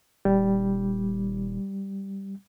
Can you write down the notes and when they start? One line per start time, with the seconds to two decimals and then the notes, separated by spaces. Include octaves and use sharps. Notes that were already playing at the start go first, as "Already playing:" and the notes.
0.25 D#1 G3